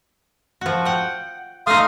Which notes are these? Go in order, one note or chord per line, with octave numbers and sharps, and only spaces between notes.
F3 F#4
F#5 G5
A3 D#4 F5 C6 D#6